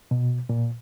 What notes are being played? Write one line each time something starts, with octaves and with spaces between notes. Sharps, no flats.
B2
A#2